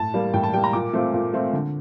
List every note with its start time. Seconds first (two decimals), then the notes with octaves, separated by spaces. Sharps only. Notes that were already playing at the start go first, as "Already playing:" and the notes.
Already playing: A2 A5
0.14 G3 A#3
0.34 A2 G5
0.43 A5
0.54 G3 A#3 G5
0.64 A#5
0.73 A#2 D6
0.93 A3 C4 F4
1.14 A#2
1.34 A3 C4 F4
1.53 D3